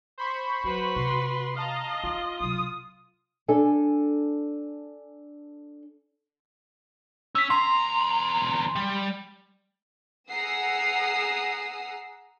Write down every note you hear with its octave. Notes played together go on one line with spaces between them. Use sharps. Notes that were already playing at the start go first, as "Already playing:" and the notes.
C5 B5 C#6
F#3 F#4 B4
C3 C6
D#5 F5 A5 A#5
D#4 F4
C3 F#3 D#6
D4 A4 G#5
C#4 E6 B6
E2 A#5 C6
G3
G#4 F#5 A#5 D#6 E6 C7